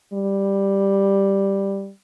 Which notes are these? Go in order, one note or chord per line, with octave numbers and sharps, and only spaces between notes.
G3